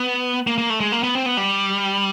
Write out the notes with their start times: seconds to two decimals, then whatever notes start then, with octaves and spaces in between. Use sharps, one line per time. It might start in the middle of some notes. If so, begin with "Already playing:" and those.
Already playing: B3
0.47 A#3
0.58 A#3
0.70 A3
0.80 G#3
0.92 A#3
1.03 B3
1.15 C4
1.26 B3
1.37 G3